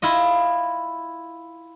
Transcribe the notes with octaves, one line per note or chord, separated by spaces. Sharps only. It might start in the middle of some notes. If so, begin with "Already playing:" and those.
E4 F4 D#5